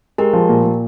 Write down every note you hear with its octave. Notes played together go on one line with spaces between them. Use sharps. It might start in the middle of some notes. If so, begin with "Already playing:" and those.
G#3 G4 A#4
F3
A#2
A#2